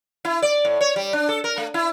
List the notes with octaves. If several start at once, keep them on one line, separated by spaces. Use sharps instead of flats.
E4
D5
A2
C#5
G3
D4
A4
A#4
A3
E4